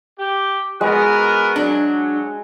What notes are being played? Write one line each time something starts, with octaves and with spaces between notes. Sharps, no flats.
G4
G#3 B3 F#4 A#4
F#3 D4